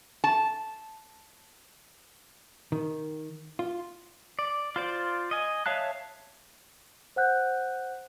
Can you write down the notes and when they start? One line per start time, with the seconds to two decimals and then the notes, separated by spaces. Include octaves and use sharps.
0.24 A5
2.72 D#3
3.59 F4
4.39 D5
4.76 F4 C5 D5
5.31 D#5 G#5
5.66 C#5 E5 F5 A5 F#6
7.16 C5 F#5 F#6 G6